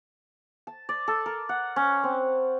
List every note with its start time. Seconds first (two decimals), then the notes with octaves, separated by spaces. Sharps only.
0.67 A5
0.89 D5
1.08 A4
1.26 A#4
1.49 F#5
1.76 C#4
2.04 C4